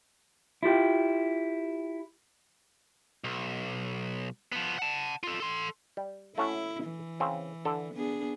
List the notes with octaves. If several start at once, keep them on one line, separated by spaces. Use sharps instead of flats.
E4 F4 G4 G5
B1
F3 B3
F#5 A5
F4 A4
A4 C6
G3
A3 C#4 E4 F#4
E3
C#3 C4
D3 A4
B3 D4 G#4